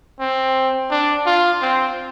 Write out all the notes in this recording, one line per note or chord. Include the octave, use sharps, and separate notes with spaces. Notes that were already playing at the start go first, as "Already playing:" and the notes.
C4
D4
F4
C4